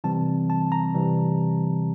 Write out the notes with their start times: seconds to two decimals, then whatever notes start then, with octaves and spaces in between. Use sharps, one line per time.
0.04 C3 E3 G3 C4 A5
0.50 A5
0.72 A#5
0.94 C3 E3 G3 C4